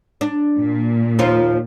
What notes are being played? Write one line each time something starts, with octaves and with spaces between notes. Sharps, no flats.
D4
A#2
D#2 F3 F4